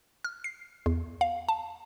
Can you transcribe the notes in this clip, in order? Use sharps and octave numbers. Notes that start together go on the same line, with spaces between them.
F6
C7
E2
F5
A5